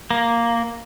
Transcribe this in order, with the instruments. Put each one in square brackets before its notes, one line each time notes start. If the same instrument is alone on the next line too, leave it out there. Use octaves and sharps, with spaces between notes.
[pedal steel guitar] A#3